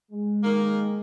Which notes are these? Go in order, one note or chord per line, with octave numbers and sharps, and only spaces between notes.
G#3
D#3 A#3